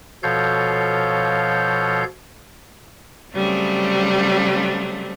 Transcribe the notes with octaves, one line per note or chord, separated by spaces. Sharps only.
B2 F3 A4 C#5 F5 G6
C#3 F#3 G3 A3 C4